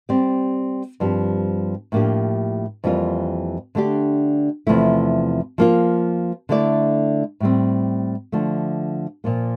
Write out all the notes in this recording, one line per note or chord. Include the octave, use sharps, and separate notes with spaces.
G3 C4 G4 D5
G2 F3 C4 G4
A2 F3 A#3 D4 G4
F2 E3 G3 A#3 F4
D3 A3 D4 G4
E2 C3 F3 A3 E4
F3 A#3 F4
D3 A3 E4 A4 D5
A2 G3 C4
D3 F3 A3
A#2 F3 A#3